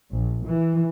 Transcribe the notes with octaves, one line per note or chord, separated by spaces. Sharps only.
A#1
E3